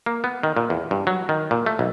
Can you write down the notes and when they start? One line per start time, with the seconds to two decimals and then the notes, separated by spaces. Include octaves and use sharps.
0.06 A#3
0.24 B3
0.43 D#3
0.57 A#2
0.70 E2
0.91 G2
1.07 F#3
1.29 D#3
1.51 A#2
1.66 A3
1.79 B1